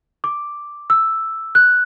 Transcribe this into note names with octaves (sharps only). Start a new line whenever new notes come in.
D6
E6
F#6